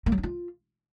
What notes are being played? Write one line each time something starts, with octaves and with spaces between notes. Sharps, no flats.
A#3
F#3
C#4
F4